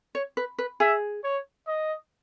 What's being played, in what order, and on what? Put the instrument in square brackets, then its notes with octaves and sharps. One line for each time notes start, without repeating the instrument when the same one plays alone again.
[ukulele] C#5
B4
B4
[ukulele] G#4 [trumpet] E5
[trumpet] C#5
D#5